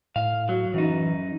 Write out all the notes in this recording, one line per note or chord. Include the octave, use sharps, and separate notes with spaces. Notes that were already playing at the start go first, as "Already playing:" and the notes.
A2 F5
F#3
F#2 E3 D#4